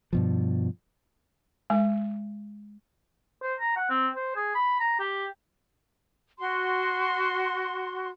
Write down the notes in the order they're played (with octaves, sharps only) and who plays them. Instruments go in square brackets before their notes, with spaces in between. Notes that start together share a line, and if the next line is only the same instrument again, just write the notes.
[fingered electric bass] G2 B2 F3
[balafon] G#3 G#5
[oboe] C5
A#5
F#5
C4
C5
G#4
B5
A#5
G4
[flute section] F#4 C6